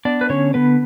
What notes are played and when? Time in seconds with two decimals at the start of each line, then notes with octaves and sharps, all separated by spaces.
0.05 B3 D4 D5
0.21 B4
0.30 D3 C#4 C#5
0.54 D3 B3 B4